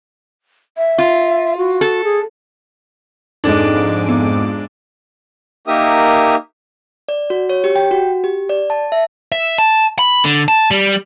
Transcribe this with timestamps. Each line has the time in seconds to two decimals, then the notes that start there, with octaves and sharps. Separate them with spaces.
0.77 E5
0.98 F4
1.57 F#4
1.81 A4
2.04 G#4
3.44 F2 G#2 G#3 D4 D#4 A4 D6
4.09 B3
5.67 A#3 D#4 G4 A#4 E5 D#6
7.08 D5
7.30 F#4
7.49 C#5
7.64 G4
7.76 G5
7.91 F#4
8.24 G4
8.49 D5
8.70 A5
8.92 E5
9.32 E5
9.58 A5
9.99 B5
10.25 D3
10.48 A5
10.71 G3